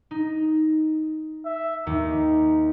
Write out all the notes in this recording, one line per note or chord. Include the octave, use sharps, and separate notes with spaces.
D#4
E5
D#2 D#4